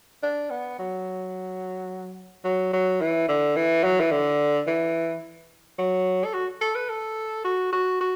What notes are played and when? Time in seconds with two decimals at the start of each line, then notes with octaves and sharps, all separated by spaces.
0.23 D4
0.50 B3
0.79 F#3
2.44 F#3
2.73 F#3
3.01 E3
3.28 D3
3.56 E3
3.84 F#3
4.00 E3
4.11 D3
4.67 E3
5.79 F#3
6.25 A4
6.34 F#4
6.61 A4
6.75 B4
6.90 A4
7.44 F#4
7.72 F#4
8.00 F#4